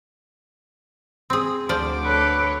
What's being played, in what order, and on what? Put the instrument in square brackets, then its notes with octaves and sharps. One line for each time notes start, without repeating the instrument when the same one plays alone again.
[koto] C4 G#4
[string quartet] D2 D6 [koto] F3 C5 D5
[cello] A4 C#5 [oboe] B4